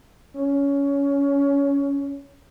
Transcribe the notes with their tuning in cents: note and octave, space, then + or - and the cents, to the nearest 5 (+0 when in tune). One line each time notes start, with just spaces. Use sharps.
C#4 +20